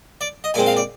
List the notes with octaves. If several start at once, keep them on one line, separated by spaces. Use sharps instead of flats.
D5
D#5
A#2 G#3 C4 G#5
F5
D5